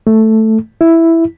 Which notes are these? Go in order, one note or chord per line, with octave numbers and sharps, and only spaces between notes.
A3
E4